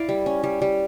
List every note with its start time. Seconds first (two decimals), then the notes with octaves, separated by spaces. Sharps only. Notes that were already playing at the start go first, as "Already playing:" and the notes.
Already playing: E4 D5 F5
0.09 G3
0.26 C#4
0.44 G3
0.62 G3